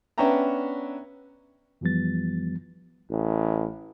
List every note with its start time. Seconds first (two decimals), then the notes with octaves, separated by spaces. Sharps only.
0.18 B3 C#4 D4 E5 G5 A#5
1.81 F#2 E3 F3 G3 B3 A6
3.11 A1